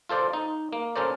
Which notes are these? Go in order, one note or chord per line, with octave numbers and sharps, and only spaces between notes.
F4 A4 C5 D5
D#4
A#3
C#4 A4 A#4 C5 D5